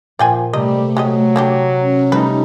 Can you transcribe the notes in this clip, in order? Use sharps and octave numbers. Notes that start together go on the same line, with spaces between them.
A#2 F3 D5 G5 G#5
C3 G3 A3 D#5
F#3 G#3 G4 D#5
A#3 D4 G4
C#4
G3 A3 D#4 B4